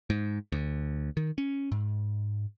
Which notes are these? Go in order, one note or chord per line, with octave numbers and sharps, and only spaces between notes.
G#2
D2
D#3
C#4
G#2